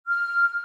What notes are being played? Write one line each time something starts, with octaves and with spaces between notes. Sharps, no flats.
F6